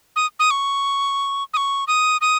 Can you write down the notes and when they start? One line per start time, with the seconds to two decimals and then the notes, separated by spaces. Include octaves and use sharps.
0.16 D#6
0.39 D#6
0.51 C#6
1.54 D#6
1.57 C#6
1.87 D#6
2.21 D#6